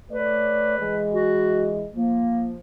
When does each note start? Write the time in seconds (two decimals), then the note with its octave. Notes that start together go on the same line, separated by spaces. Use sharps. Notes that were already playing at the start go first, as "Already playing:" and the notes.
0.11 A3 B4 C#5 D5
0.78 E3 G#3
1.12 F#4
1.94 F3 A#3